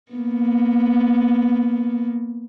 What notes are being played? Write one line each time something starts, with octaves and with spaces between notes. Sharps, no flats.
A#3 B3